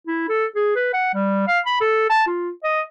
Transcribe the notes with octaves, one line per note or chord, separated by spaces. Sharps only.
E4
A4
G#4
B4
F#5
G3
F5
B5
A4
A5
F4
D#5